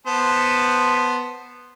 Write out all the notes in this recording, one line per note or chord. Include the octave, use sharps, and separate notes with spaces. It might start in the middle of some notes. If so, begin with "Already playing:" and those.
B3 C5 A5